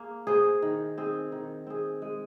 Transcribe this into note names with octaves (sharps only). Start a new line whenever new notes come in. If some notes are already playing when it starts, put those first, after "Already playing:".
Already playing: A#3 G#4
G#4 C5
D#3
C4 G#4
D#3
C4 G#4
G#3